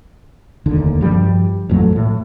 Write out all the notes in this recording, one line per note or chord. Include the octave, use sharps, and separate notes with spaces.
F1 D#2 D3
G2 F3 G3
A1 F2 F#3 A3
A2